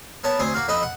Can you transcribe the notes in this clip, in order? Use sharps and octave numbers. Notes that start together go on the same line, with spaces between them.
B3 A#4 C#5 A5
D2 C4 G#5 D#6
A#3 F#4 F5
F2 D#4 B4 D#5 E5
F#5